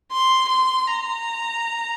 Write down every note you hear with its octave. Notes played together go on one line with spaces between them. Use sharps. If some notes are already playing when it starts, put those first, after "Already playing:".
C6
C6
A#5